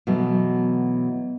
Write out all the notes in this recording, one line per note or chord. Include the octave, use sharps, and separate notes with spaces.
B2 E3 F#3 A3